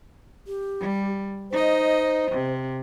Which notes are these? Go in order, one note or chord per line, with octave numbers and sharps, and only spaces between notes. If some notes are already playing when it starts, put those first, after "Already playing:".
G4
G3
D#4 C5 D#5
C3